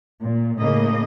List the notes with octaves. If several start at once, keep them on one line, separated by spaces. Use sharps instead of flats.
A#2
A2 C#3 A#3 D#5